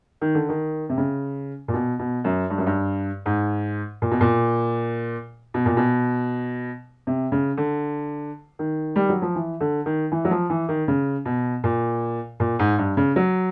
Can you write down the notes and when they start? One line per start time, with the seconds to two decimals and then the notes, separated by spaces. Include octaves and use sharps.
0.21 D#3
0.35 D3
0.49 D#3
0.89 C3
0.97 C#3
1.68 A#2
1.74 B2
1.99 B2
2.24 F#2
2.50 G2
2.58 F#2
2.66 G2
3.26 G#2
4.02 A#2
4.11 B2
4.21 A#2
5.54 B2
5.66 A#2
5.77 B2
7.07 C3
7.32 C#3
7.58 D3
8.59 D#3
8.96 G3
9.09 F#3
9.22 F3
9.35 E3
9.60 D3
9.86 D#3
10.12 E3
10.25 F#3
10.31 F3
10.50 E3
10.69 D#3
10.88 C#3
11.25 B2
11.64 A#2
12.40 A#2
12.59 G#2
12.78 G2
12.97 C#3
13.16 F#3